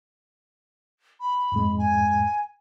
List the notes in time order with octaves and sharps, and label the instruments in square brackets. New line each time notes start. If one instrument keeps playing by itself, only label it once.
[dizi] B5
[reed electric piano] F2 G#2 G#3
[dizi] G#5